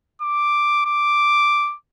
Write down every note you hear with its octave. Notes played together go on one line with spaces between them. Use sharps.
D6
D6